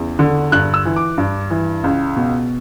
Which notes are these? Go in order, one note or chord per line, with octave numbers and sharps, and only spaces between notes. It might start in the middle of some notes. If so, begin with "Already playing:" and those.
Already playing: E2 C#3
D3
G2 F#6
E6
E3
D6
G2
E3
C#2
B2